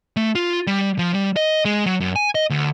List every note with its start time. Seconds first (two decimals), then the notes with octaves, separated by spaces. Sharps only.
0.17 A3
0.35 F4
0.67 G3
0.99 F3
1.14 G3
1.36 D#5
1.65 G#3
1.86 F#3
2.00 F#2
2.16 G#5
2.35 D#5
2.50 D2